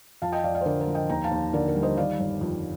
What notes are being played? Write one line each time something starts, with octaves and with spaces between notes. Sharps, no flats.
F2 F5 A5
D#5 G5
F2 D5 F5
D5 F5
C5
D3 A#4 D5
A#4
F3
D#5 G5
D#2 G5 A#5
F5 A5
D#2
D3 A#4 D5
A#4
G3
C5 D#5
D#3 D5 F5
G1
F2